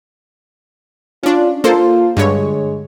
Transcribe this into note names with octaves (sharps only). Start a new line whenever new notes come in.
C#4 D4 F4
A#3 F4 A4 C5
G2 D3 G#3 C#5